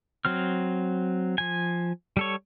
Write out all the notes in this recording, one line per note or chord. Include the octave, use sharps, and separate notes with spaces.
F#3 C4 F6
F3 G#5
G3 A4 C#5